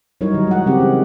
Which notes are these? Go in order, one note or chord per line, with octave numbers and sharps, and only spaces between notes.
F#3 G3 D#4 E4 A#4 C#5
D#3
G#3 F#5
C#3 C4 G4
E3